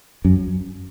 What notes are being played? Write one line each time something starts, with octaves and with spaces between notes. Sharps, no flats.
F#2